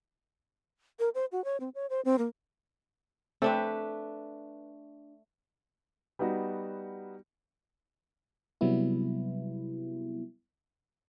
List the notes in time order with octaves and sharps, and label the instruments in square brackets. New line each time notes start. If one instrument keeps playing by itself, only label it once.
[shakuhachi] A#4
C5
F#4
C#5
C4
C#5
C5
C4
A#3
[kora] A3 D4 B4 [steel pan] C4
[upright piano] G3 B3 D#4 F#4
[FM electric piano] C3 F#3 G3 B3 E4